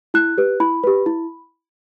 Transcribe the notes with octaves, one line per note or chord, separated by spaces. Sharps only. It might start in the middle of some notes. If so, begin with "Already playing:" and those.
E4 F#6
G4 B4
E4 B5
G4 B4
E4